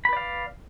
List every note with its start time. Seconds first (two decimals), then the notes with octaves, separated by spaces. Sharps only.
0.05 B5
0.09 B4
0.13 D5
0.17 F5